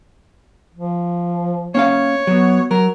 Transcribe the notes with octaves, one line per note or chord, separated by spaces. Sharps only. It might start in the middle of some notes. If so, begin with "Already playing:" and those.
F3
A#3 C#4 C#5 F5
F#3 B3
F#3 A#4